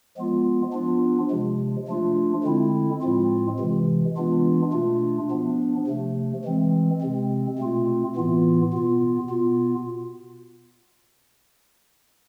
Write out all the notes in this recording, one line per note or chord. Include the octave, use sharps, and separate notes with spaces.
F3 G#3 B3 F4
F3 B3 D4 F4
C3 F3 G#3
F3 A3 D4 F4
D3 G#3 C4 E4
A2 F3 G#3 C4 F4
C3 E3 G#3
E3 G#3 B3 D4 F4
B2 A3 D4 F4
F3 B3 D4
C3 F3 A3
E3 G#3 C4
C3 G#3 C4
B2 A3 C4 F4
A2 E3 B3 F4
B2 B3 F4
B2 B3 F4